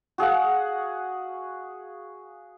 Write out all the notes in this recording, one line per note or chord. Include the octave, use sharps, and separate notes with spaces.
F#4 G#4 F5 F#5